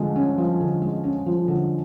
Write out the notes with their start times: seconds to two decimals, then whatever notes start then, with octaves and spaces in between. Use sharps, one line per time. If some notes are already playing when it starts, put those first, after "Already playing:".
Already playing: D3 F3 G#3
0.16 C#4
0.38 F3
0.61 D3
0.82 G#3
1.04 C#4
1.26 F3
1.48 D3